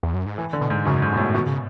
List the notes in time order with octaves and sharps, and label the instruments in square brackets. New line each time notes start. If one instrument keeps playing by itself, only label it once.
[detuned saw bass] E2
F#2
G#2
[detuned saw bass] A2 [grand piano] E3
[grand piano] D3
[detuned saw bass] B2
[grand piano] G#2
[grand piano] F#2 [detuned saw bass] C#3
[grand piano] G#2
B2
A2
[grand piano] B2 [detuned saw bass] E3
[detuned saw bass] C#3